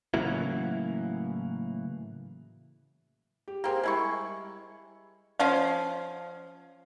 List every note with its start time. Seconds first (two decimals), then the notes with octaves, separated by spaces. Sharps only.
0.14 A2 C#3 E3 F#3 A#3 E4
3.48 G4
3.64 A#3 C4 G4 G#4 A#4
3.83 G3 G#3 E4 C#6
5.39 F3 C#4 F5